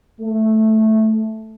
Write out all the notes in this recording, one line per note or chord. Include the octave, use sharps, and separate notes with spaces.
A3